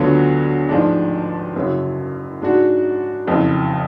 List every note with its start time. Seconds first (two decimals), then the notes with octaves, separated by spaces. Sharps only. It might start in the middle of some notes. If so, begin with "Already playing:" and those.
Already playing: D2 D3 F#3 B3 F4
0.69 A1 G#2 F3 G#3 D4
1.56 F#1 F#2 C#3 F#3
2.42 G#2 G#3 D4 F#4
3.27 F#1 F2 C#3